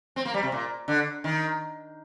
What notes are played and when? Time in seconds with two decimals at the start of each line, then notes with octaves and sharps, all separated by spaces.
0.16 C4
0.25 A#3
0.34 G3
0.43 C3
0.52 A#2
0.88 D3
1.24 D#3